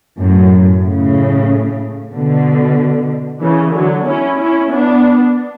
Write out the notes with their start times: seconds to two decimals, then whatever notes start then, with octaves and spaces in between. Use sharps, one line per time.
0.18 F#2 A2
0.83 A2 C#3
2.13 B2 D3
3.42 C#3 E3
3.74 D3 F#3
4.07 C#4 E4
4.39 C#4 E4
4.72 B3 D4